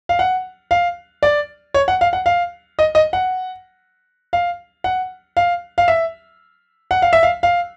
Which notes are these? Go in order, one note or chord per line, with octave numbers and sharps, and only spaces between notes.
F5
F#5
F5
D5
C#5
F#5
F5
F#5
F5
D#5
D#5
F#5
F5
F#5
F5
F5
E5
F#5
F5
E5
F5
F5